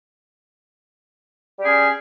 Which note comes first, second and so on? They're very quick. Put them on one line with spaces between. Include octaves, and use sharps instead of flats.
G3 G4 G#4 C#4